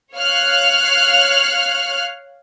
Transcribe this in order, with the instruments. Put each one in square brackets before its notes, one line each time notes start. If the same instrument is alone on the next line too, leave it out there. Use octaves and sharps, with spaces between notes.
[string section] C#5 F5 F6 F#6